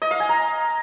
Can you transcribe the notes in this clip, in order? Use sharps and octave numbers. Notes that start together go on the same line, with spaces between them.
D#5
F5
G#5
A#5